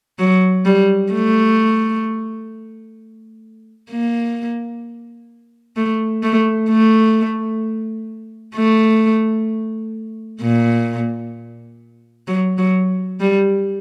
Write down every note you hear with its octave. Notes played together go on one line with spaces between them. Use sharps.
F#3
G3
A3
A#3
A3
A3
A3
A3
A#2
F#3
F#3
G3